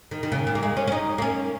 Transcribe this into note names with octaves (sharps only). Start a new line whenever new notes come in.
D#3
D#3
C#3
A#2
A#3
G#3
C#4
C#4
D#4
A#3
C#4